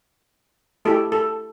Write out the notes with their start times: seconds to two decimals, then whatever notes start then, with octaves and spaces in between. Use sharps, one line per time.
0.85 A3 E4 G4 A4
1.12 A4